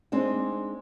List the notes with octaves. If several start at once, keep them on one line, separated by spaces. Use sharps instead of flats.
G#3 C4 D4 D#4